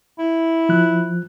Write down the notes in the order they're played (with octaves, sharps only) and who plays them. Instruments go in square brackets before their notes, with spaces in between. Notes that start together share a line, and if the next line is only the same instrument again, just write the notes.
[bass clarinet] E4
[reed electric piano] F3 F#6